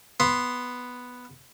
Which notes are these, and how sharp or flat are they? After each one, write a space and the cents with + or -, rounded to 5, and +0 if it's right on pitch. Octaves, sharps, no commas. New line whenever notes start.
B3 +0 C6 +0